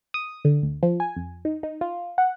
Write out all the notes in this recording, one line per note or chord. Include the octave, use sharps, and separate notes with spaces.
D#6
D3
D2
F3
G#5
F2
D#4
D#4
F4
F#5